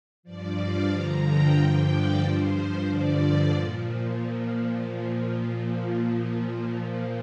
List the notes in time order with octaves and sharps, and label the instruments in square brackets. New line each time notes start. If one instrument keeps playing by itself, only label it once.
[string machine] G2 F3 D5
F5
G2 D3 F3 A#5
G5
G2 D3 F3 G5
D5
G2 F3 C5
G2 D3 F3 D5
A#2 F3